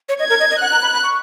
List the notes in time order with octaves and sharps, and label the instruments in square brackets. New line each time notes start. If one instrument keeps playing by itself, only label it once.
[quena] C#5
[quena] D#5 [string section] G#6
[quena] A#4
D#5
D#5
[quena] F#5 [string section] F#6
[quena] A#5
B5
B5
C#6